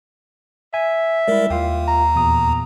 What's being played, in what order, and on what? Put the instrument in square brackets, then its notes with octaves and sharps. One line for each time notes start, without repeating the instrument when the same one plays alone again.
[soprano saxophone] E5 [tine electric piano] G#5
[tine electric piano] G3 E4 [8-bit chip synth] G#3 A#4 D5
[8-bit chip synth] D#2 [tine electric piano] F4 F5 G5
[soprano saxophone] A#5
[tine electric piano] E2 A#2 D#6